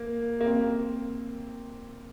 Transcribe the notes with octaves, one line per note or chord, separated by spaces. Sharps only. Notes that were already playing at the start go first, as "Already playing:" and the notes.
Already playing: A#3
A#3
C4